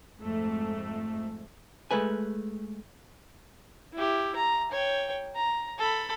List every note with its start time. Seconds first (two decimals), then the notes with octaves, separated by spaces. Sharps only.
0.19 F2 G#2 A3
1.91 G#3 A3 B4 G#5
3.94 E4 G4
4.36 A#5
4.71 C#5 G5
5.36 A#5
5.78 A4 B5